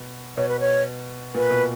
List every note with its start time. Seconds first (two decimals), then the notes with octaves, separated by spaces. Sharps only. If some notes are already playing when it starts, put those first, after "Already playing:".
Already playing: B2
0.37 B2 C#5
0.49 B4
0.60 C#5
1.34 A#2 B4
1.51 B2